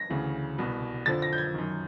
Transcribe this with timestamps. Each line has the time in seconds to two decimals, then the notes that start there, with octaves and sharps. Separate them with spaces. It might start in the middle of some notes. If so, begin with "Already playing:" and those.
Already playing: A#6
0.10 D2 C#3 E3
0.58 C2 B2
1.06 F2 D3 F3 A6
1.22 A#6
1.33 G6
1.38 G#6
1.54 F#2 D#3